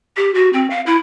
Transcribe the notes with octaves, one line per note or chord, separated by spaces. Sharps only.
G4
F#4
C4
F5
E4